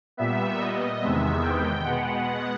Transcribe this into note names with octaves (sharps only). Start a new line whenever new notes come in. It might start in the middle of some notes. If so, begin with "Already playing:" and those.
A#2 G3 B3 E5
D#5
E2 C3 D#3 G#3 B3 E5
G5
B2 G#3 B3 F#5